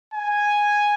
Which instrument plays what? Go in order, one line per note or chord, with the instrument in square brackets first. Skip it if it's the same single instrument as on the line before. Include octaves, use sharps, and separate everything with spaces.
[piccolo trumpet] G#5